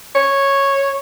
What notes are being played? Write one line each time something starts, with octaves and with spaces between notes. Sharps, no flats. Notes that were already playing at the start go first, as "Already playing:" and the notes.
C#5